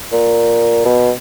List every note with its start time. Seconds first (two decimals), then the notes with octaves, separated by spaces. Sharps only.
0.12 A#2
0.85 B2